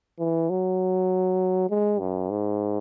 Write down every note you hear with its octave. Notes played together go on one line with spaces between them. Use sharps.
E3
F#3
G#3
F#2
G#2